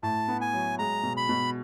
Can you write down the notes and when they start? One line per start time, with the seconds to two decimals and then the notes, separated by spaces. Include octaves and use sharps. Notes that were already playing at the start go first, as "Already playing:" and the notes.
0.03 A2 A5
0.28 B3
0.41 G#5
0.53 F#3
0.79 G#3 A#5
1.03 B2
1.17 B5
1.29 B2